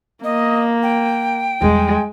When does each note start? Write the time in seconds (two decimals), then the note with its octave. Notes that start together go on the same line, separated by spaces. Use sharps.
0.24 A#3 D#5
0.83 G5
1.62 E2 G3 G#3